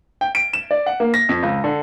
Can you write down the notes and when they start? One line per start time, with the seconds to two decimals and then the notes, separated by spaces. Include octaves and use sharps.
0.21 G5
0.35 D7
0.53 E7
0.71 D5
0.86 F#5
1.00 A#3
1.14 A#6
1.29 F2
1.43 C#2
1.64 D3